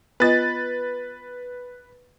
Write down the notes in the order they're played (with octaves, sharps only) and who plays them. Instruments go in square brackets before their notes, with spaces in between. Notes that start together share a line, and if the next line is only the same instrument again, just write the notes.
[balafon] B3 F4 D#5 [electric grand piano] B4 A6